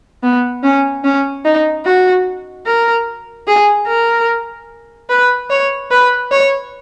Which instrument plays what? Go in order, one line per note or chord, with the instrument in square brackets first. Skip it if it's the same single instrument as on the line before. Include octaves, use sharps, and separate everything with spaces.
[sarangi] B3
C#4
C#4
D#4
F#4
A#4
G#4
A#4
B4
C#5
B4
C#5